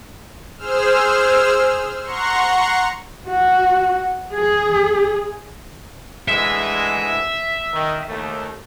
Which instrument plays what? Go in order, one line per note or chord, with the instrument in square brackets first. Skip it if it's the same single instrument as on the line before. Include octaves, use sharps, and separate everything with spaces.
[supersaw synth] G#4 C5 E6 F6
F#5 A#5 C6 C#6
[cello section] F#4
G#4
[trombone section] D2 E3 G#3 [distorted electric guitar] E5
[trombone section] D#3
D#2 A3